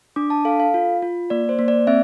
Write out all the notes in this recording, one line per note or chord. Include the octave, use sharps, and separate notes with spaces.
D4 D6
A5
A4 F5
F5
F4
F4
A#3 D5
C5
A#3
D5
C4 E5